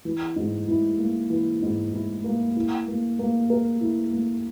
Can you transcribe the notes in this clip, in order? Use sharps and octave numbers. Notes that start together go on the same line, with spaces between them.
E3
G#2
E4
A#3
E3
G#2
E4
A#3
E4
A#3
A#3
A#4
E4
A#3